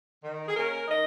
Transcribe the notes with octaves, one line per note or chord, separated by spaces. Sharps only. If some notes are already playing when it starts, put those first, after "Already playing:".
D#3
G#4
A#3 C#4 A#4
D#3 D#5